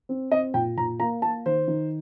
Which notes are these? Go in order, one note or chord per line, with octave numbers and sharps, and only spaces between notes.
C4
C4 D#5
A#2 G5
A#2 A#5
A#3 A#5
A#3 A5
D#3 C5
D#3